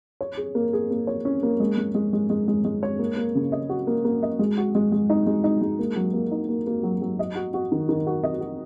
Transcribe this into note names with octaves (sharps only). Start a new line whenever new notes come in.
C#5
G#4
A#3
G#4
A#3
C#5
C#4
A#3
G#3
G#3
G#3
G#3
G#3
G#3
G#3
C#5
A#3
A#3
C#3
D#5
F#4
A#3
A#3
D#5
G#3
F#4
G#3
G#3
D#4
G#3
D#4
G#3
A#3
F#3
A#3
D#4
A#3
A#3
F#3
F#3
D#5
F#4
F#4
D#3
D#3
F#4
D#5
F#4